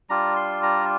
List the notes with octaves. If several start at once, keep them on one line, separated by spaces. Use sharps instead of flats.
G3 D4 F4 A#5
C6
A#5